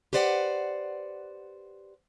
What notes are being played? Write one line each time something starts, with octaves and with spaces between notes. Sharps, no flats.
G4 B4 C5 D5 E5 F#5